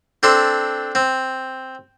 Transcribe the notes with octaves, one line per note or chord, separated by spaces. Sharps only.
C4 D4 A4 C6
C4